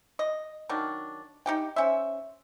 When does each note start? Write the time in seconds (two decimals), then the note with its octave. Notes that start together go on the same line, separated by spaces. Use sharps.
0.19 D#5
0.69 D#3 F#3 D4
1.46 D#4 G4 G5
1.76 C#4 C5 E5